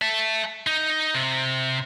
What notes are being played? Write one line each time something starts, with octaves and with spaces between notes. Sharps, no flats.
E5 A5
D#4
C3